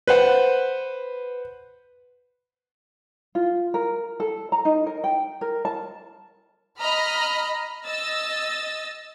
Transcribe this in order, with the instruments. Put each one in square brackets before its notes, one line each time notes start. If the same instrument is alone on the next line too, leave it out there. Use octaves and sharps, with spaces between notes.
[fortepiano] B4 C5 F#5
[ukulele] F4
A#4
A4
A#5
D#4
A#4
G5
A#4
A5
[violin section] D#5 A#5 B5 F6
D#5 E6 A6